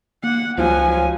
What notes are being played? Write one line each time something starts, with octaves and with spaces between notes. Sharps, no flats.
A#3 F#5
C#2 F3 F#3 G#5